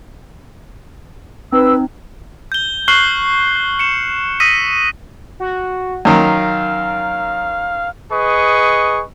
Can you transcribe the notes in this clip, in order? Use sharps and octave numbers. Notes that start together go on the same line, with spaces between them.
C4 D#4 B4 E6
G6 G7
C#6 F6 F#6 C7 F#7 G7
C#7 E7
D#6 E6 A#6 B6 D#7
F#4
F#2 D#3 F5
G#4 B4 D#5 C#6